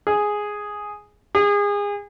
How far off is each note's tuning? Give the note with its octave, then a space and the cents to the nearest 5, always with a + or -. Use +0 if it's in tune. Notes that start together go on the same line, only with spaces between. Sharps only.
G#4 +0
G#4 -30